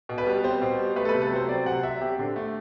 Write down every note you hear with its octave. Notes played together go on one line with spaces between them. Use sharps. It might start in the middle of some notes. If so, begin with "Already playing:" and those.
B2
B4
G3
C4 C5
B2
G3
A3 B4
A4
C3 B4
A4
F#3 C5
C4 D5
C3 F#5
F#3 E5
C4 G4
D3
A3